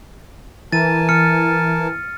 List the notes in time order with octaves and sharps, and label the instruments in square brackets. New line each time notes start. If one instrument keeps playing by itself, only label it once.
[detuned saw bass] E3 [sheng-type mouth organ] A#4 G#5 A5 [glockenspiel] A6 D#7
[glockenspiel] F6 C#7